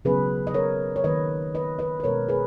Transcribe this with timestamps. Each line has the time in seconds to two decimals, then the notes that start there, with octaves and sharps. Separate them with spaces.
0.05 C#3 F#3 B3 G#4 B4
0.47 D#5
0.54 A#4 C#5
0.96 C#5
1.04 D#3 A#3 B4 D#5
1.55 B4 D#5
1.79 B4 D#5
2.00 B4
2.04 B2 G#3 B3 A#4 C#5
2.28 G#4 B4